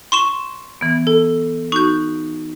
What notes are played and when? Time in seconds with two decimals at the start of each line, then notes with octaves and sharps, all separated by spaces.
0.12 C6 C#6 E7
0.81 E3 B3
1.07 A4
1.72 D#4 F#4 C#6 G6